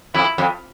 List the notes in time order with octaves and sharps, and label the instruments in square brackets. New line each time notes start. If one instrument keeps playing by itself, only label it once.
[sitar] F2 [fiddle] E4
[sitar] F2